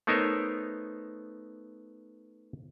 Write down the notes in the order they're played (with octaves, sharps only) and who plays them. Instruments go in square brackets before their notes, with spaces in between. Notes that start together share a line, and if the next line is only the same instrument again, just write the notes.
[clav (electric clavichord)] A3 B3 D#4 A#4 C5 C#5